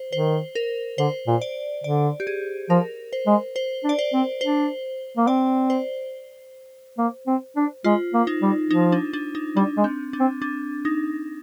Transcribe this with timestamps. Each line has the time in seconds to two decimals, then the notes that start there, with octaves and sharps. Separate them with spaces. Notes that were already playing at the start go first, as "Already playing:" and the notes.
Already playing: C5
0.13 D#3 C5
0.55 A#4
0.98 D3 C5
1.27 A#2
1.41 D5
1.84 D3 D5
2.20 G4
2.27 G#4
2.70 F3 A#4
3.13 C5
3.27 G#3
3.56 C5
3.84 D4
3.89 D5
3.99 C5
4.13 C4
4.41 D4 C5
5.17 A#3
5.27 C4 D5
5.70 C5
6.98 A#3
7.27 C4
7.56 D4
7.84 G#3 F4
8.14 A#3
8.27 D#4
8.42 G3
8.70 F3 D#4
8.92 D4
9.13 D4
9.35 D#4
9.56 G3 D4
9.77 G#3
9.84 C4
10.13 D4
10.20 C4
10.42 D4
10.85 D#4